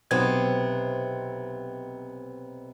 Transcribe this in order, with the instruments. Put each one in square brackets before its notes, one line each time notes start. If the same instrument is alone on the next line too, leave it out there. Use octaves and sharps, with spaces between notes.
[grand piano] B1 [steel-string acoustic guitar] C3 B3 C4 [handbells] G#6